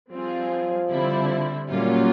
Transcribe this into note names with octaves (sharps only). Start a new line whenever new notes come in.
F3 G3 C4 F4 G#4
D3 G3 C4 E4
A#2 F#3 G3 A#3 C#4 F4